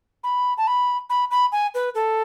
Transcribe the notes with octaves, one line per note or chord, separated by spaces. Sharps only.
B5
A5
B5
B5
B5
G#5
B4
A4